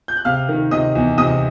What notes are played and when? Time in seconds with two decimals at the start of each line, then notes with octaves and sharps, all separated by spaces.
0.08 G6
0.17 F#6
0.25 C3 F5 F6
0.49 D#3
0.71 C3 D#5 D#6
0.95 E2
1.18 C3 D#5 D#6